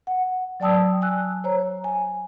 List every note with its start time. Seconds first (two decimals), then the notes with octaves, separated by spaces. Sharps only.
0.07 F#5
0.60 F#3 D5 G5 A5 D#6 E6
1.01 G#5 E6 F#6
1.44 C5 C#5 A#5
1.84 G#5